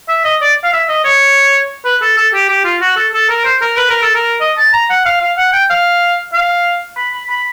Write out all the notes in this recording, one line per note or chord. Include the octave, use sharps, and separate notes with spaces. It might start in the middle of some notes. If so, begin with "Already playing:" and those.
E5
D#5
D5
F5
E5
D#5
C#5
B4
A4
A4
G4
G4
F4
F#4
A4
A4
A#4
C5
A#4
B4
A#4
A4
A#4
D#5
A5
A#5
F#5
F5
F5
F#5
G5
F5
F5
B5
B5
B5